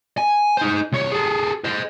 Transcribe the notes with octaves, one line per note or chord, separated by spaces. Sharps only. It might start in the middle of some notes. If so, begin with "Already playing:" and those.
G#5
D#4 C5
C2 C#5
G#4 A4
C5 D#5